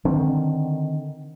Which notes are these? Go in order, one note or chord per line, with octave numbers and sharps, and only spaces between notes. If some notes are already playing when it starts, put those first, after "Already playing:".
D3 D#3 C4